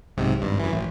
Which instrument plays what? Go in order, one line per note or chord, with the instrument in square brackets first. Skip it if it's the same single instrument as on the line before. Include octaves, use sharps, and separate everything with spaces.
[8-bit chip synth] B1 G#2 C3
G#1 G2
F#2 E3
A1